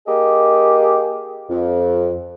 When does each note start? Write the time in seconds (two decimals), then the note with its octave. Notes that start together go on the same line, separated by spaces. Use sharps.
0.07 A#3 G4 G#4 D#5
1.50 F2